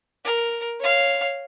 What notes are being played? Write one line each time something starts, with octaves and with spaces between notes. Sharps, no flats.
A#4
C#5 F5